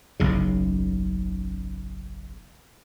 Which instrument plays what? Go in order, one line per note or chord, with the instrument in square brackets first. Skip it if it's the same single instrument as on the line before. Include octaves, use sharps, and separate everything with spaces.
[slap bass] F#1 B1 C#3